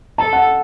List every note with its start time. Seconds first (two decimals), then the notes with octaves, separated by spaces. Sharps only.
0.18 A4 A5
0.33 F#5